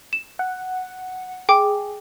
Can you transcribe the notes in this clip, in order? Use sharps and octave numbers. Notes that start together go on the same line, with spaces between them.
E7
F#5
G#4 G5 D6